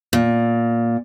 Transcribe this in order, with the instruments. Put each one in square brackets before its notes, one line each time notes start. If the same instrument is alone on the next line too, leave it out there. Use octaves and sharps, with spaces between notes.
[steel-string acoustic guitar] A#2